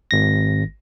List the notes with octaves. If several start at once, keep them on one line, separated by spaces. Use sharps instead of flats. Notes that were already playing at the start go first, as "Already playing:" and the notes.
G#1 A#6